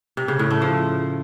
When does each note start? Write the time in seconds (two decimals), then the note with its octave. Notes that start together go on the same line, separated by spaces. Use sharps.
0.17 C3
0.28 C#3
0.39 A2
0.51 A3
0.62 F3